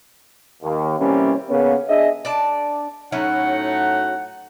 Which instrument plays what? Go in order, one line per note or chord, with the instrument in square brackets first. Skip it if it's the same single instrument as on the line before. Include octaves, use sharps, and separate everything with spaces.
[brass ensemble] D#2
C3 E3 G3 A#3 C#4
C#3 A#3 B3 C#4
D4 G#4 D#5 E5
[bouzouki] D4 D5 A5
[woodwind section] A2 D#4 F#5 [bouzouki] F#3 C#4 E4